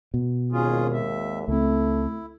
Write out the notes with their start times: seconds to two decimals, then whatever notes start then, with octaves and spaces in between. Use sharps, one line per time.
0.14 B2
0.52 G#1 D#2 C#4 F4 G#4
0.93 E5
1.48 C#2 A3 C4 E4